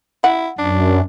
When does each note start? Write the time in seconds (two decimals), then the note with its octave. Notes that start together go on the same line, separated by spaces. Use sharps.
0.24 E4 F#5
0.59 F#2 D4